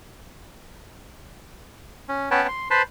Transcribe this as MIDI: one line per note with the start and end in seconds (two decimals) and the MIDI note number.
2.09 2.30 61
2.31 2.47 59
2.31 2.47 61
2.31 2.47 71
2.31 2.47 73
2.31 2.47 79
2.31 2.47 81
2.48 2.68 84
2.71 2.82 71
2.71 2.82 72
2.71 2.82 81
2.71 2.82 83
2.71 2.82 84